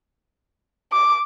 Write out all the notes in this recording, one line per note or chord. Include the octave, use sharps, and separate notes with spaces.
D6